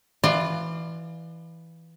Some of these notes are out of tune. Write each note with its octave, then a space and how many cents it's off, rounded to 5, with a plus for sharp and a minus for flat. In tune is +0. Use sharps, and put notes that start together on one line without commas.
E3 +0 F4 +0 D5 +35